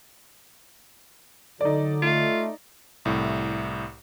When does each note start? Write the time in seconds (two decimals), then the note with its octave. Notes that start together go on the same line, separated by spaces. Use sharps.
1.61 D3 F#3 D#4 A4 D5
2.02 A3 F4
3.05 C2 A2